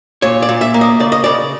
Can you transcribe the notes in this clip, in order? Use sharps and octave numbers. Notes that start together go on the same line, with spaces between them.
A#2 C#5
D5
A#2
E5
A#3
D#5
C#3 D5
D#5
C#3 D5